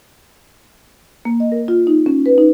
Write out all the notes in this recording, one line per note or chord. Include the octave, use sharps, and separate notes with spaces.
A#3
D#5
A#4
F4
D#4
C#4
B4
D#4